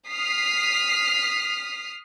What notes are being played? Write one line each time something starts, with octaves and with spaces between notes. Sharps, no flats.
D#6 F6 B6 C7